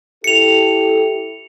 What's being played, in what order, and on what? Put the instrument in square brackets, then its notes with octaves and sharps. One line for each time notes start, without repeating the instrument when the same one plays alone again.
[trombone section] E4 G4 A4 [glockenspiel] C#7 F7